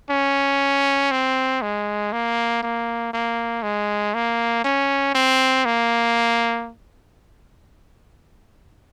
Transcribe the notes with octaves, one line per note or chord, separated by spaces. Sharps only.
C#4
C4
G#3
A#3
A#3
A#3
G#3
A#3
C#4
C4
A#3